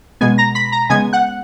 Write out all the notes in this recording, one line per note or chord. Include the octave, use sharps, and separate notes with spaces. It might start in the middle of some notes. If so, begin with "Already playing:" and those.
B2 G#3 B3 G#5 G#6
A#5 A#6
B5 B6
A#5 A#6
C#3 G#3 B3 G#5 G#6
F#5 F#6